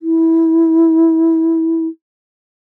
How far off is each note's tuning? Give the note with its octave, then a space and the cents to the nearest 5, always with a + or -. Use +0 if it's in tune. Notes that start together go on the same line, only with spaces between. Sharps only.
E4 -15